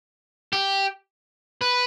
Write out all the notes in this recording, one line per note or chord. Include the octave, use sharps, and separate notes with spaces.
G4
B4